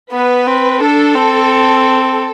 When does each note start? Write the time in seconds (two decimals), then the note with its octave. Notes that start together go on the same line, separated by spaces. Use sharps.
0.12 B3 B4
0.47 C4
0.81 D4 A4
1.14 C4